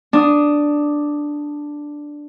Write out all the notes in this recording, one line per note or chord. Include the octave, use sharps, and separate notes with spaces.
D4 D#6